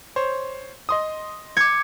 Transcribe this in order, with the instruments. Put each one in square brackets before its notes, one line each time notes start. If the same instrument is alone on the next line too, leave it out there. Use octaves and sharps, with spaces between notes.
[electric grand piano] C5 C#5
D#5 C6 D#6
[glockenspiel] D6 C#7 [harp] G#6